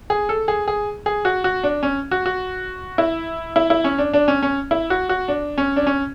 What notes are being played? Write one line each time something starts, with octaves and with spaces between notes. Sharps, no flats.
G#4
A4
G#4
G#4
G#4
F#4
F#4
D4
C#4
F#4
F#4
E4
E4
E4
C#4
D4
D4
C#4
C#4
E4
F#4
F#4
D4
C#4
D4
C#4